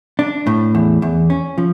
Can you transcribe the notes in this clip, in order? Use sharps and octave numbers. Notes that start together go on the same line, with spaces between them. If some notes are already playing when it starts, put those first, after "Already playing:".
D4
A2
E2
E2
C#4
F3